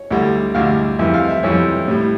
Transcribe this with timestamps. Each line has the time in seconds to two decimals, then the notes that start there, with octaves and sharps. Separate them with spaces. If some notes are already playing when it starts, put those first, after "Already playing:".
Already playing: C#5
0.11 D2 D3 G3
0.55 D2 D3 G3 F5
0.99 F2 E3 G3 E5
1.14 F5
1.29 E5
1.43 F2 E3 G3 C#5
1.88 A2 G3